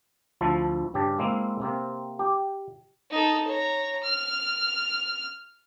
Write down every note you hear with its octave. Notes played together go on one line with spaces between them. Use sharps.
D2 F3 E4 A5
G2 C#3 G4 A5
G#3 A#3 C4 E4
C3 A#3 C4
G4
D#4 A4
C#5 A#5
F6